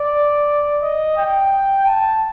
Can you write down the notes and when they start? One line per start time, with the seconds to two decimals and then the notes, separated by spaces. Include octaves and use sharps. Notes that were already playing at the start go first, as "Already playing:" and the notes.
Already playing: D5
0.81 D#5
1.16 G5
1.86 A5